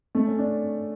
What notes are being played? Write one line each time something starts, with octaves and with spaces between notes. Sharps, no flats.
A3
C#4
D4